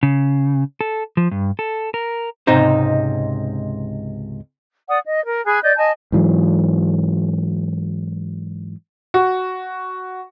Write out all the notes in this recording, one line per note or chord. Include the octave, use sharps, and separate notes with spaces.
C#3
A4
F3
G2
A4
A#4
C#2 G#2 C3 D#4 C5
D5 F#5 D#6
D#5
A#4
G#4 G#5 B5 F#6
D5 D#5 G6
D#5 G#5 A5
G#2 E3 F#3
F#4